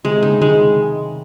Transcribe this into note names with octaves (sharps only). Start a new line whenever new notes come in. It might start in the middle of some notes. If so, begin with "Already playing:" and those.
C3 G#3
C#3 D#4
D#3 G#3